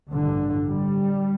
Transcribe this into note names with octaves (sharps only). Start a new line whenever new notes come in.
A1 G2 D3
G3